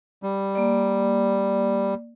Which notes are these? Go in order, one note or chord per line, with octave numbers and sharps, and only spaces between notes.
G3
A#3 D5